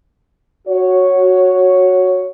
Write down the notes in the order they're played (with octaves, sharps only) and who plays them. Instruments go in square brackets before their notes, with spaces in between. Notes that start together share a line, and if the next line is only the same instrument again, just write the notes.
[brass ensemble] F#4 C#5